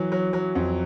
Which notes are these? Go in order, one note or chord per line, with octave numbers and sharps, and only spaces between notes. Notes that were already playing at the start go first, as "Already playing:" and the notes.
Already playing: E3 F#3
F#3
F#3
F2